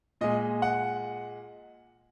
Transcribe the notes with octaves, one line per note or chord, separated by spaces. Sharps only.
A#2 G#3 D#5
F#5